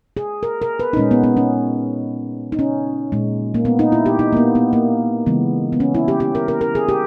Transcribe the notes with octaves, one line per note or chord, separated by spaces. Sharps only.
G#4
A#4
A#4
B4
D#4
A#2 G#3 C#4
B3
B3
C#4
D#4
C#4
A#2 G#3
A#3
B3
D#4
E4
G4
D#4
A#3
B3
B3
A#3
C#3 E3 G#3 B3
B3
C#4
E4
G4
G4
A#4
A#4
A#4
G#4
G4